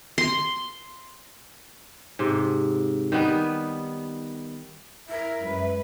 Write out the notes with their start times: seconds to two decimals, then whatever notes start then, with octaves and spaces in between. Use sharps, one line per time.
0.18 C6
2.19 G#2 C3
3.12 D#3 G3 B3 B4
5.09 E4 A#4 E5
5.43 F#2 G#3 B4